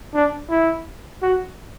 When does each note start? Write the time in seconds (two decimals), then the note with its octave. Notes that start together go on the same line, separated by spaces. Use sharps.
0.15 D4
0.50 E4
1.22 F#4